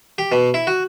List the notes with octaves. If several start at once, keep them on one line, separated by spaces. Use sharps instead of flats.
G4
B2
E4
F#4